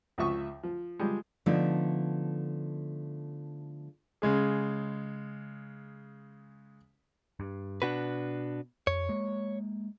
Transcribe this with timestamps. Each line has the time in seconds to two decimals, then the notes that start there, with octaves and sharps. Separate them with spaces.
0.18 C#2 F3 E5 C#6 D#6
0.63 F3
0.99 F3 G3 G#3
1.46 D3 F3 A3 B3 D#4
4.22 C#3 G#3 G#4
7.40 G2
7.82 B2 D4 F#4 B4
8.87 F2 C#5
9.09 G#3 A#3